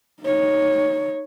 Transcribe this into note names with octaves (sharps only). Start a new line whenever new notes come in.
D#4 C#5